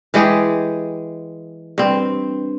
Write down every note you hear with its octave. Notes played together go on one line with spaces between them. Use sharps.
E3 G#3 G4 G#4
G2 C4